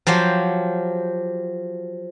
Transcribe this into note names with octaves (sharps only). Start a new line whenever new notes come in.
F3 F#3 G4 C5